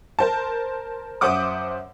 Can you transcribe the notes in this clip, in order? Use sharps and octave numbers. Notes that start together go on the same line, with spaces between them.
A#4 C5 A5
F#2 C5 E5 F#5 D6 D#6